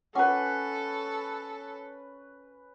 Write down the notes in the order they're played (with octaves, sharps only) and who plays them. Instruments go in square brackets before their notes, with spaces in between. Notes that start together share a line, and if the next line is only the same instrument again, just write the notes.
[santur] C#4 B4 [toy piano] F4 F#5 D6 [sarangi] A4